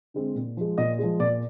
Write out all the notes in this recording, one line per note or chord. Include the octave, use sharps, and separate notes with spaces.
D3 G#3 C4
A#2
F3 G#3
A#2 D#5
F3 G#3
A#2 D5